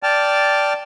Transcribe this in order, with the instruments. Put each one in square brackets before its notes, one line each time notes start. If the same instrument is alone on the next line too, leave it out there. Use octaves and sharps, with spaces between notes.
[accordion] D5 G5 A5 F6